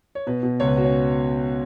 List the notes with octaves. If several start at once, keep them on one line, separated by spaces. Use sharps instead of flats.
C#5
B2 B4
B2
C#2 C#5
B4
F#4
C#4